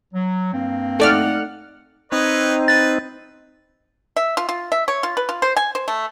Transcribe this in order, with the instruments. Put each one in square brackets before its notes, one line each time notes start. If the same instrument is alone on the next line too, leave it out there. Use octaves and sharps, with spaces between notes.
[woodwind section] F#3
G2 A#3 C4
[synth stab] A3 D5 F6 [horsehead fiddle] D#4 F#5
[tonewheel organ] C4 D#4 [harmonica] B4 C#5 D#5
[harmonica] B4 [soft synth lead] A6
[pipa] E5
F4
F4
E5
C#5
F4
B4
F4
C5
G#5
C5
A3